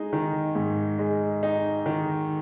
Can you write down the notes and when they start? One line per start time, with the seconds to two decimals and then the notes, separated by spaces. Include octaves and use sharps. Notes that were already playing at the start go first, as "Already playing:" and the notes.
Already playing: G#3 D#4
0.13 D#3
0.55 G#2
0.99 G#3
1.43 D#4
1.86 D#3